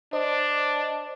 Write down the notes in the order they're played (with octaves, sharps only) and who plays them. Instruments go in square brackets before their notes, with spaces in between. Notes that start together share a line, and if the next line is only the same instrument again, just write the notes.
[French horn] D4 [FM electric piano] C5 D#5